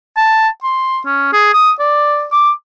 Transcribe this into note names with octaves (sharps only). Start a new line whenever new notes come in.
A5
C6
C#4
G#4
D#6
D5
D6